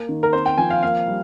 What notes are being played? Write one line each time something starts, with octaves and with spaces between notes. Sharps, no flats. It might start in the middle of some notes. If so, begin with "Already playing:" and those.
Already playing: A#3
D#3
A#4
C4 C5
G5
F3 G#5
F5
A#3 F5
G3